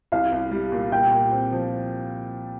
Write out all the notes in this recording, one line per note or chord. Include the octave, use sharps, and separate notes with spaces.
C2 F5
C2
G3
A#2
A#2 G5
A#2
C4
F3